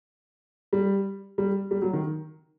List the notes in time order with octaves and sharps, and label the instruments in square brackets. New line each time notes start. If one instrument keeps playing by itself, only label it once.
[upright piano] G3
G3
G3
F#3
D#3